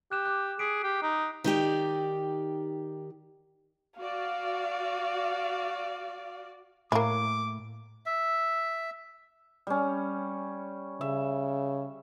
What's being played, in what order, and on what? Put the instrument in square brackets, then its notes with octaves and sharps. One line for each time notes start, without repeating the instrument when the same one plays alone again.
[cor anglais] G4 [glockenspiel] F#6 E7
[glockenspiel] D6 F#6
[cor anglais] G#4 [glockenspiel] B6 C7 D7
[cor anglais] G4
D#4
[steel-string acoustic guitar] D#3 D#4 G4 D5
[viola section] F#4 D5 [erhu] F5
[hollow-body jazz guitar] A2 [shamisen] A#3 E4 [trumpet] D6
[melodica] E5
[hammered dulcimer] G3 C#4
[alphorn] C#3 [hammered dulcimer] E5